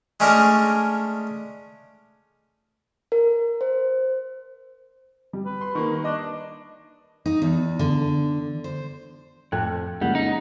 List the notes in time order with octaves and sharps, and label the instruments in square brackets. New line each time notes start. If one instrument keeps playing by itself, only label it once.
[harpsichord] G#3 A3 C#4 D4 G#4 A#4
[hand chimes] A#4
C5
[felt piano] G3
[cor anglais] B4
[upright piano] C6
[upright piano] D#3 A#3 [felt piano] C#6
[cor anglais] D4 [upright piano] D#5
[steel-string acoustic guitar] D#4
E2
D3
C5
[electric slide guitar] F2 [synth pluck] A2 A4 F#6 [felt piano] G5 A5 G#6
[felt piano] F2 C#3 F#5 [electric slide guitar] G3 [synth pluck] G#3 A#3 G6
[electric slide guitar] D#4